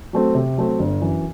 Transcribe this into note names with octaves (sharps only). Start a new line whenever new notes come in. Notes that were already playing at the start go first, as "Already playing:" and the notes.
F#3 A3 C4
C3
F#3 A3 C4
G1
F#2 E3